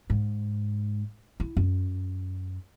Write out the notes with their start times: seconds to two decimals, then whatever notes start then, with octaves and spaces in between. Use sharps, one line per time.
0.10 G#2
1.40 E4
1.57 F#2